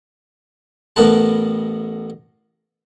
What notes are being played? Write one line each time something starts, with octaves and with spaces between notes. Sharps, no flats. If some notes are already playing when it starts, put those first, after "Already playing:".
A1 A2 B3 A#4 B4 A5